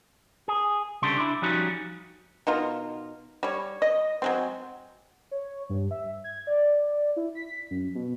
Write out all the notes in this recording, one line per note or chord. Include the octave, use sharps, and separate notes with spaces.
G#4
C2 C#3 G3 D4 A4 C6
D4 E4
F3 G3 C#4 D#4 F#4
B2 D#4 F4 A#4
G3 C#5
D#5
F#3 G#3 C4
C#5
G2
E5
G#6
D5
E4
B6
F#2
B2